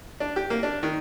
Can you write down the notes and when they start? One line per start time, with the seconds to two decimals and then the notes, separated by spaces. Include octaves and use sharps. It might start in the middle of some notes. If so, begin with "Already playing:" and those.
0.20 D4
0.36 G4
0.50 A#3
0.63 D4
0.83 D#3